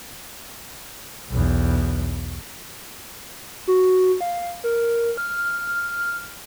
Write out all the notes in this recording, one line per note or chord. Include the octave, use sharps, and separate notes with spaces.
B1 E2
F#4
F5
A#4
F6